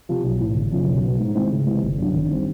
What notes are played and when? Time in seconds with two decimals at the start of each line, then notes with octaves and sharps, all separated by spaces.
0.09 C3 F3
0.24 B1
0.40 A2 E3
0.55 G1
0.72 F#2 C#3 F3
0.87 B1
1.03 B2 F#3 B3
1.19 G#2
1.35 D#3 G#3 C4 E4
1.50 C#2
1.67 C3 E3 G#3
1.83 G1
1.99 F#2 D3
2.14 G#1
2.31 D#3 G3 C4